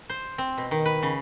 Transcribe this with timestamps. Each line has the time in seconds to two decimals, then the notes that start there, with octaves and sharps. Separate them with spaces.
0.10 C5
0.38 C4
0.58 B2
0.71 D#3
0.85 B4
1.03 C#3